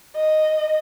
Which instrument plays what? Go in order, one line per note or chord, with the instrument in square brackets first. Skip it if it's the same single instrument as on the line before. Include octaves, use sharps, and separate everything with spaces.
[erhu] D#5